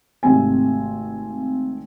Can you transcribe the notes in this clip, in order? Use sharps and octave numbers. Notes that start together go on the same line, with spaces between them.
G#1 C3 A3 C4 G#5